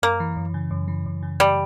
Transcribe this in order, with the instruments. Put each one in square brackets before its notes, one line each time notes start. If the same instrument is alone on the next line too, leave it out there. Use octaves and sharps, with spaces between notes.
[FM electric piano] F#2 [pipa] A#3
[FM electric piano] E3
F#2
C#3
F#2
E3
F#2
C#3
[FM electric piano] F#2 [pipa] G3